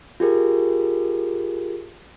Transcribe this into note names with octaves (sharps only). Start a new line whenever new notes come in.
F4 G4 G#4 A#4